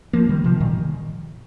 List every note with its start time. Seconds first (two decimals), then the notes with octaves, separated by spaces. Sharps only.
0.13 F3 A#3
0.29 D#3 G3
0.44 C3 F3
0.60 A#2 D#3